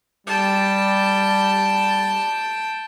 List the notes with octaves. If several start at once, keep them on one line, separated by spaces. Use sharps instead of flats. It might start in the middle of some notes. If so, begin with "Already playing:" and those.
G3 G5 A5